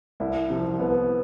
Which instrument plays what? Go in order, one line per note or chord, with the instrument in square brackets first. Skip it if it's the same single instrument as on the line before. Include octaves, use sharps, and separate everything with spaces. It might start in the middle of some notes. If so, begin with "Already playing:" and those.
[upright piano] C2 [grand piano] E4
[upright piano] C3 F3
[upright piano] C2 [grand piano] B3